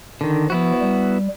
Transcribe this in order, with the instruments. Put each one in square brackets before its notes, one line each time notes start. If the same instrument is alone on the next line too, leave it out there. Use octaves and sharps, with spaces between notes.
[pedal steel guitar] D3 D#3
[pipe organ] F3 [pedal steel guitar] B3 E4 F#4
[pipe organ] G3